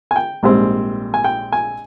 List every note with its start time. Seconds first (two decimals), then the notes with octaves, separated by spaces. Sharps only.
0.11 G#5
0.16 G5
0.43 A#1 G#2 G3 C4
1.14 G#5
1.24 G5
1.52 G#5